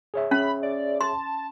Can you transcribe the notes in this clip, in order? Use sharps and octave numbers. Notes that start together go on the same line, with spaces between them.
G#4 C#5 E5
C#4 B5
D5
A5 C6